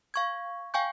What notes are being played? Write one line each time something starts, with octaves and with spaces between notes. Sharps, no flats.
F5 C#6 G#6
F5 G5 G#5 C#6 G6